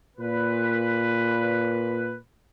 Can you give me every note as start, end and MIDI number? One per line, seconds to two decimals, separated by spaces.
0.18 2.15 46
0.18 2.15 71